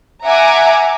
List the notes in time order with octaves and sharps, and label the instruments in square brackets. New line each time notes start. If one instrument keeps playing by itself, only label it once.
[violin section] E5 F#5 G#5 A#5 D6